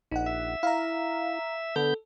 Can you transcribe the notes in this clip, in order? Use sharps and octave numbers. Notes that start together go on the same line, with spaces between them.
A#1 D#4 F#5
E5
E4 F5 A#5
D3 B3 A4 G6